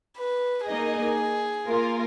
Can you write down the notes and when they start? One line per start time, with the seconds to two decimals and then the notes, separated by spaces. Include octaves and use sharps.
0.17 B4
0.67 A#3 D#4 G#4 A#4 D#5
1.67 A#3 F4 A#4